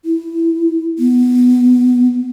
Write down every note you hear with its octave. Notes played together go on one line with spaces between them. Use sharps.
E4
B3